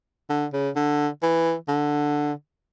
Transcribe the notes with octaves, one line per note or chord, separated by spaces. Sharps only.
D3
C#3
D3
E3
D3